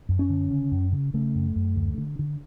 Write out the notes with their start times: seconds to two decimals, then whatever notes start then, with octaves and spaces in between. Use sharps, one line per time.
0.09 F#2
0.19 C#4
0.30 D3
0.51 C#3
0.72 F#2
0.92 C#3
1.14 C#3 A3
1.35 F#2
1.56 F#2
1.76 D2
1.98 D3
2.19 D3